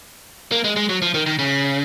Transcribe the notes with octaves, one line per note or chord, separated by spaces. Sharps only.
A#3
G#3
G#3
F#3
F3
D#3
D#3
C#3